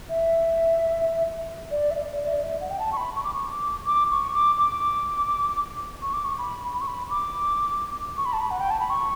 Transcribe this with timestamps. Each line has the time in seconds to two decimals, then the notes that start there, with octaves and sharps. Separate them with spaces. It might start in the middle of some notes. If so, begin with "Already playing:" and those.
0.09 E5
1.71 D5
1.91 E5
1.96 D5
2.19 D5
2.26 E5
2.33 D5
2.44 E5
2.61 F#5
2.70 G5
2.79 A5
2.92 C#6
2.97 B5
3.15 C#6
3.24 D6
3.34 C#6
3.50 D6
3.87 D6
4.11 C#6
4.35 D6
4.59 D6
6.02 C#6
6.13 D6
6.25 C#6
6.38 B5
6.74 B5
6.81 C#6
6.88 B5
7.10 D6
8.17 C#6
8.26 B5
8.33 A5
8.41 B5
8.51 F#5
8.60 G5
8.70 A5
8.80 B5
8.90 C#6